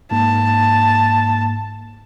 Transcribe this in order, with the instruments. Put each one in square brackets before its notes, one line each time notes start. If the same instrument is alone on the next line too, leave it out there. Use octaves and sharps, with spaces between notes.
[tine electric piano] G#2 A#3 [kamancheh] A5